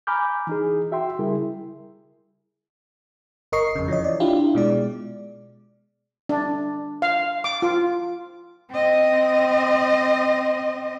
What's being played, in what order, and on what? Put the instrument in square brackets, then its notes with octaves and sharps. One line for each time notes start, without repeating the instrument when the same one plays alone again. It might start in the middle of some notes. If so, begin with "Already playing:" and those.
[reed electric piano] G#5 A#5 B5 D6 F6 G6
E3 D#4 G#4
F#4 E5 G5 C6
C#3 G3 E4 G#4 A#4
[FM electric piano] G1 A#4 D#5 C#6 C7
F2 C#3
E3 F3 C#5 D#5
D5
D4 E4 F4 G4
B2 G#3 D5
[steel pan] D4
F5
D6
F4
[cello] C4 D#5